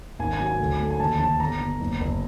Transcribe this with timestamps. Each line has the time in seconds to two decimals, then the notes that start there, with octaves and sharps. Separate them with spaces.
0.19 G#1 G#5
0.33 G#5
0.40 F#3
0.46 G#5
0.59 D2
0.79 A3
0.90 G#5
1.00 D#2 A5
1.20 D#2 A5
1.40 G1 A#5
1.61 G1
1.80 F#1
2.01 F#1